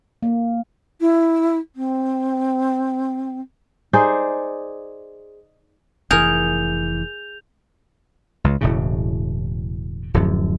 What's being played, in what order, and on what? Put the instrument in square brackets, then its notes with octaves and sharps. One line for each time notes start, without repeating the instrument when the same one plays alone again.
[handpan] A#3
[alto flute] E4
C4
[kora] D#4 G#4 C5 D5
[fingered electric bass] F1 E3 [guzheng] G#4 A#4 [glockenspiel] G6 F7
[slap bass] C#2
E1 A2 C#3
D1 F#2 F3